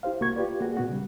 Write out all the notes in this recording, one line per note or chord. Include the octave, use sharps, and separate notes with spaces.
E4 G4 C5 F5
C2 A#3 F#4 C#6 G#6
F4 G4 B4 D5
A#3 F#4 G#4
A#2 B3 F#4
C#3 G3